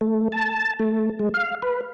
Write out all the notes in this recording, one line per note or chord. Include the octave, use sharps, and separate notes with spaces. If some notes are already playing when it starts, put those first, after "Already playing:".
A3
A5
A3
G#3
F5
B4